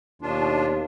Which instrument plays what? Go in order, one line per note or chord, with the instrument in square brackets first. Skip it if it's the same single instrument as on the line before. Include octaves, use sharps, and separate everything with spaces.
[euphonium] D#2 [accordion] B2 D4 F4